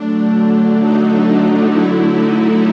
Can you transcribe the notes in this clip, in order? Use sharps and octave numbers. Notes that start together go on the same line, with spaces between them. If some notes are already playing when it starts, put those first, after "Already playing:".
Already playing: D3 F#3 A3 D4
D#4
E4
D#4